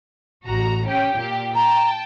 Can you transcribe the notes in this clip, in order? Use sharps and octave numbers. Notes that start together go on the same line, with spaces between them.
A1 F#4 A#5
C#4 G4 G5
A#2 G4
G5 A5 A#5